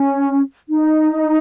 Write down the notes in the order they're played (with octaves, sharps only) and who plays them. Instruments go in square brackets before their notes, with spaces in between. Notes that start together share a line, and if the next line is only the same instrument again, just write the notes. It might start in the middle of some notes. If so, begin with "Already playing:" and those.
Already playing: [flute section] C#4
D#4